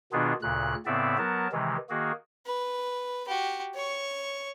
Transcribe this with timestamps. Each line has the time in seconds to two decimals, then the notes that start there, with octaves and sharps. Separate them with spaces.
0.12 B2 D#3 B3 D4 F4 G#4
0.42 D2 A#2 C#3 F#6
0.86 A2 C#3 B3 C4 D5 E5
1.18 F#3 B3 A#4 A5
1.52 C3 D#3 E3 G#3
1.90 D#3 A#3 F#4 G#4
2.46 B4
3.28 F#4 G4
3.74 C#5 C#6